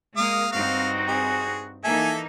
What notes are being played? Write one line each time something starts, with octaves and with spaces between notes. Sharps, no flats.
G#3 A#3 F5 D#6
G2 C4 D#4 F#4 F5
G#4
E3 A#3 D#4 A4 E5 G#5